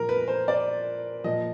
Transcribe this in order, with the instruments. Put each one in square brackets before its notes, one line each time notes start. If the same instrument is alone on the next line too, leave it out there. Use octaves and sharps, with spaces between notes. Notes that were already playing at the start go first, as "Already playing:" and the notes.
Already playing: [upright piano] A#2 F3 A#4
B4
C5
D5
A#2 F3 D#5